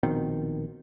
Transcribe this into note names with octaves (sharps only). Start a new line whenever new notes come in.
A#1 B2 D#3 C4